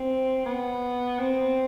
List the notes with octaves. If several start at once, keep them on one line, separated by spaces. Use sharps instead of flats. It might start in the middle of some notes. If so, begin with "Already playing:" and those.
Already playing: C4
B3
C4